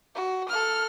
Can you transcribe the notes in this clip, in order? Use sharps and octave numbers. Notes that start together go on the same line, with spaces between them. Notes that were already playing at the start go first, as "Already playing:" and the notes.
F#4
A4 F6